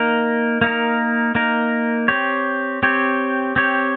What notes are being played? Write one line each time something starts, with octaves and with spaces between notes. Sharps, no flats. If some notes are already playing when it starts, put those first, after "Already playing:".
Already playing: A#3 D#4 A#4
A#3 D#4 A#4
A#3 D#4 A#4
C4 G4 C#5
C4 G4 C#5
C4 G4 C#5